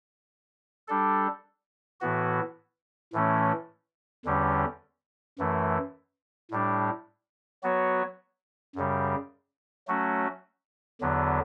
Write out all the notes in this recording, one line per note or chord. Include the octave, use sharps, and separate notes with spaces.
G3 D4 A4
A2 E3 B3 F#4
A2 E3 A3 C#4
E2 D3 G3 C#4
F#2 E3 A3
A2 G3 D4
F#3 B3 F#4 C#5
F#2 C#3 G3
F#3 A3 C#4 F#4
E2 D3 F#3 B3